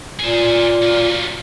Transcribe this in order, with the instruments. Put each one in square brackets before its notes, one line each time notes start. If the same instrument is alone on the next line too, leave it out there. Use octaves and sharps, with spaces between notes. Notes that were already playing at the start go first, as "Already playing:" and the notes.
[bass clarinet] A#2 [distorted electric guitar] G#4 C5
[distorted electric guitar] F#3 F4